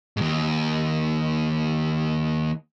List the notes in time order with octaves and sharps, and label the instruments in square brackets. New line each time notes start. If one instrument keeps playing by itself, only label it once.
[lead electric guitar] D#2 G#2